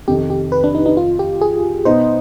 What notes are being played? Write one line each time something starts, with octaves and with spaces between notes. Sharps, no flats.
F2 C3 D#3 G4
G4
B4
D4
D#4
D#4
F4
G4
G#4
B2 B3 D#4 C5